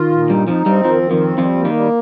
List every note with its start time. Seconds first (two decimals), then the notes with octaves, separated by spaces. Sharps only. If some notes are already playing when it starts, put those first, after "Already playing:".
Already playing: D#3 F4
0.12 A#2
0.29 G2 G3 D#4
0.48 F2 F3 D#4
0.66 G2 G3 C4
0.84 F2 D#3 F3
1.02 D#3
1.11 F2 F3
1.21 C4
1.37 F2 F3 G3
1.57 A#3
1.65 D#3
1.74 G3